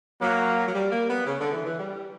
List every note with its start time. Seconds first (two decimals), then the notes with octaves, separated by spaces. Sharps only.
0.21 F#3 A#3
0.67 F#3
0.74 G3
0.91 A#3
1.08 B3
1.26 C#3
1.39 D3
1.52 E3
1.65 E3
1.78 G3